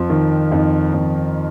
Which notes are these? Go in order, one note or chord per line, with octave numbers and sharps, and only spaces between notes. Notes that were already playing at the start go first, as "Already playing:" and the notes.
Already playing: F2 F4
D#3
F2 D#4
F2